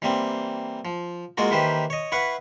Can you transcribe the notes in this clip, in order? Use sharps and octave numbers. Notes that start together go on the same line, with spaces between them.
E3 G3 A#3 C4
F3
G#3 A#3 F4 F#4 A#4
D#3 E3 A#3 G4 B4 C5
C#5 D#5
E4 B4 F5 F#5 C#6